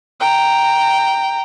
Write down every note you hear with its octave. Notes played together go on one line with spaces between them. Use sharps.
G5 A#5